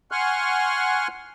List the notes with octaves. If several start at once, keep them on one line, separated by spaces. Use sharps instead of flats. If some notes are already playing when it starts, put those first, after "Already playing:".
F#5 G#5 C6 C#6 F6 F#6